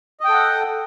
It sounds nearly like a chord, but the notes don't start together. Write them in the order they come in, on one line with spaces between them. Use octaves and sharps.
D#5 G5 A4 F#5